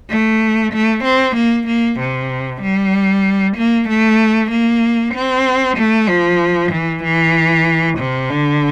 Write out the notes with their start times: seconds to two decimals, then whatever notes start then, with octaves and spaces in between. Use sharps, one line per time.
0.10 A3
0.73 A3
1.04 C4
1.36 A#3
1.67 A#3
2.00 C3
2.62 G3
3.57 A#3
3.89 A3
4.51 A#3
5.14 C4
5.78 A3
6.09 F3
6.72 E3
7.04 E3
7.98 C3
8.30 D3